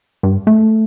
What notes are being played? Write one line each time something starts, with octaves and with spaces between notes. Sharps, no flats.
G2
A3